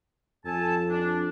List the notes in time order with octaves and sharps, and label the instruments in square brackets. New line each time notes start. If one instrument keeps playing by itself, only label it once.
[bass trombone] F2 [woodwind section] A4 G#5 A5
[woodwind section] D4